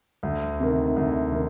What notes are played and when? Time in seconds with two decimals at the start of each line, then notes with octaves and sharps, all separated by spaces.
0.23 D2
0.60 C3 D#3
0.96 D2
1.32 C3 D#3